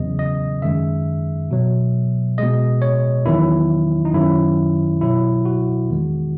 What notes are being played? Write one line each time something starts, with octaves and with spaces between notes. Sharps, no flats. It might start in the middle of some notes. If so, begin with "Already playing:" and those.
Already playing: E2 C#3 F#3 D#5
D#5
F#2 D#3 G#3 E5
B2 F#3
B2 G#3 D#5
C#5
E2 D#3 F#3 E4
D#4
F#2 D#3 F#3 E4
B2 F#3 E4
F#4
E2 D#3 G#3